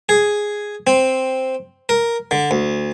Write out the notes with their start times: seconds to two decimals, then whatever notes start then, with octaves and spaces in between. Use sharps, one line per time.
0.09 G#4
0.87 C4
1.89 A#4
2.31 D3
2.51 D2